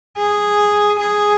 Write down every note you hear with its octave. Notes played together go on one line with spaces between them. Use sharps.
G#4
G#4